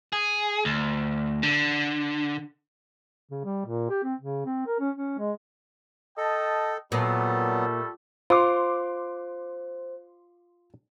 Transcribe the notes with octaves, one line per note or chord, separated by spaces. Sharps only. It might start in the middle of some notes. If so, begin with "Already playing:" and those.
G#4
D2
D3
C#3
G3
A#2
G4
C4
C#3
C4
A#4
C#4
C#4
G#3
A4 D#5 G5 A5
A#2 F#3 G3 A3 B3 A4
F4 C5 C6 D6